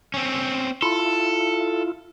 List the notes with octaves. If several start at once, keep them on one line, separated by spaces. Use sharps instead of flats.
C4 C#4
E4 F4 A4